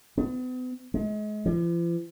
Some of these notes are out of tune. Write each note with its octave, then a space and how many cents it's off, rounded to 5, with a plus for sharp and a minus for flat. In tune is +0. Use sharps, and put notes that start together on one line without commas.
B3 +40
G#3 +35
F3 -45